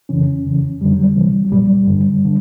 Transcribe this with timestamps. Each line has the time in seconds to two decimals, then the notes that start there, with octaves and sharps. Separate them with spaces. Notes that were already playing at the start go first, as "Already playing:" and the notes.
0.09 F2 C#3 E3 C#4
0.45 E2 C#3 E3
0.81 F2 D3 G3
0.91 F#3
1.03 G3
1.17 C2 C3 E3
1.44 F#3
1.52 C2 A#2 G3
1.87 G2 D3
2.25 D3